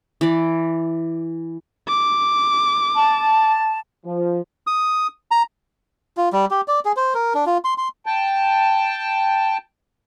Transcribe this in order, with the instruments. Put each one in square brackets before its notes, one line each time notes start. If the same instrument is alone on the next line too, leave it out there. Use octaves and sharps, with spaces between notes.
[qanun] E3 D5
[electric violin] D6
[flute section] A5
[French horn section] F3
[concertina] D#6
A#5
[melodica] F4
G3
G4
D5
G#4
C5
A#4
D4
F4
C6
C6
[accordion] G5 A5